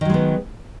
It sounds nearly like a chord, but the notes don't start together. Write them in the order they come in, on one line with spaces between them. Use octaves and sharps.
D#3 F#3 G#3 B3